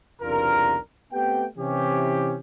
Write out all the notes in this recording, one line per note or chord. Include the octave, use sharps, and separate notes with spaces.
B1 E2 C3 D4 F4 A#4
A3 B3 C4 G4 G5
C3 E3 C#4 G4